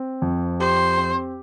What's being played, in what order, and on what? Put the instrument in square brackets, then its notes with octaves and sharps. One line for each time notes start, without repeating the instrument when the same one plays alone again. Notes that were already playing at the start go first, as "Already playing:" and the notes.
Already playing: [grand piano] C4
F2
[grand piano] G4 [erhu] C5
[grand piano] C4